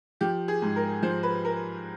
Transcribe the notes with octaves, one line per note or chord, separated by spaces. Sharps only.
F3 G4
G#4
G#2
A#4
F3 C5
B4
A#4